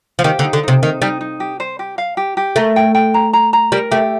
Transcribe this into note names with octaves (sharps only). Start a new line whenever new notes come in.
F3
D#3 G4
D3
D#4
D3
C3 D#4
D#3 D#4
G3 D#4
D#4
G4
C5
G4
F5
G4
G4
A3 A#4
G5
G5
A#5
A#5
A#5
G3 A#4
A3 G4